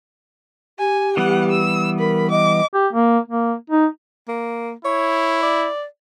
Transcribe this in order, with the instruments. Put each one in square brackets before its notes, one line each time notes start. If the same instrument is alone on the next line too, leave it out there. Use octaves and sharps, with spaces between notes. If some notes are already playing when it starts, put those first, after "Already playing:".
[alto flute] G4 [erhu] G#5
[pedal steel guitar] E3 G3 B3 [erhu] F#5
[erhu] E6
[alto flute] A#4 [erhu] B5
[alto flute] D#5 [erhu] D6
[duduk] G4
A#3
A#3
D#4
[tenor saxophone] A#3
[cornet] E4 [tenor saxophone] C#5
[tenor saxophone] D5